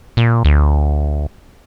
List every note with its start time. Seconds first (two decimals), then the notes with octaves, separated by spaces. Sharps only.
0.17 A#2
0.45 D2